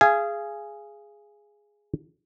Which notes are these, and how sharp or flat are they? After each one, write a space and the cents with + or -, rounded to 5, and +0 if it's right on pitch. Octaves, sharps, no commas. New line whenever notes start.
G#4 +0 F5 -30 G#5 +0